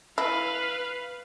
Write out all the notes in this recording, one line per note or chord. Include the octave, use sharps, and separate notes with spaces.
E4 B4 F5